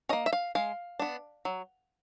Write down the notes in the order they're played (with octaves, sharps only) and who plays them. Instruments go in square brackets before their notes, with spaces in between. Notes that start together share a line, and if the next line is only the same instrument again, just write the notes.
[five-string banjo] A#3 C#4 D#5
E5
F5
G#3 F5
B3 D4
F#3